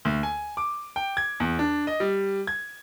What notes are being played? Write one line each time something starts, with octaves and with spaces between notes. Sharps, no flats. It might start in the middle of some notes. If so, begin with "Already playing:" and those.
D2
G#5
D6
G5
G#6
E2
D4
D#5
G3
G#6